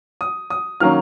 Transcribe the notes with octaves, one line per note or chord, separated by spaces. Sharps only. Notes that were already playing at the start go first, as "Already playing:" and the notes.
D#6
D#6
D#3 F#3 A#3 C#4 F6